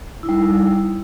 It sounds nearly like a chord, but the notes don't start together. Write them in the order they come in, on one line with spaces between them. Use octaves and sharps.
E4 D#4 G3